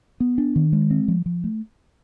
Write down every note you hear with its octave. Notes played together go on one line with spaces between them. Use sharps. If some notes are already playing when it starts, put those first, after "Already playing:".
B3
D4
D#3
G#3
C4
F3
F3
A3